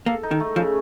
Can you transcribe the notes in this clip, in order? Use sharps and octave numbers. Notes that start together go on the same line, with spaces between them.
A#3 A4
D#4
D#3
A3
C#3 F3